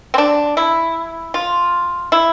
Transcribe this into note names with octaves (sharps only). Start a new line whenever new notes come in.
C4
D4
E4
F4
E4